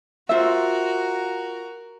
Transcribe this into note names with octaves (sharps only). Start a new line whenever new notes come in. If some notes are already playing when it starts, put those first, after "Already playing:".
F4 F#4 A#4 C5 E5